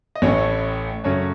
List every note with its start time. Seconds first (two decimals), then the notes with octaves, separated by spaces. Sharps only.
0.15 D#5
0.22 A1 A2 A3 C#4 C#5
1.04 F#2 C#3 A3 C#4 C#5